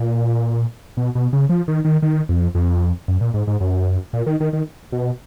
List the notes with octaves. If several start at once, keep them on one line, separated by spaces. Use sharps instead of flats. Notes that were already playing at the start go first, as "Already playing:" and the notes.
Already playing: A#2
B2
B2
C#3
F3
D#3
D#3
D#3
F2
F2
F#2
A#2
G#2
G#2
F#2
A#2
D#3
D#3
D#3
B2